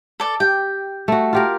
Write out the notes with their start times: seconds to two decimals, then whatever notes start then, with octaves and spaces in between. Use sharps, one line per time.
0.20 A4 D5
0.40 G4 G5
1.08 A3 F#4
1.33 F4 G4 A#4